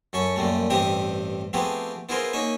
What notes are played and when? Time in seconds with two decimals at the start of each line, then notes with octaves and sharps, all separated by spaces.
0.13 F#2 C#4 A4 C#6
0.36 F#2 A#2 G3 A3
0.70 A1 G2 C4 G4 E5 D#6
1.53 F3 A3 B3 C4 G4 G#4
2.09 B3 E4 F4 G#4 A#4 C5
2.33 A#3 C#4 D#4 E5